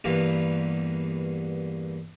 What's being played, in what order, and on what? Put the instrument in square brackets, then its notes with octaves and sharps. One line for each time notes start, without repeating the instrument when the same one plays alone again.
[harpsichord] E2 G2 A#3 B3